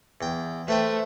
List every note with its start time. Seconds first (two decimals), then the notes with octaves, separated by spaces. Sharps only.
0.21 E2 G5
0.68 A3 B4 C5 G5